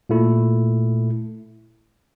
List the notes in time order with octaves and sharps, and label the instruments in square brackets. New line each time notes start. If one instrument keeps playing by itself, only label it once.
[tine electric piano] A#2 A3 E4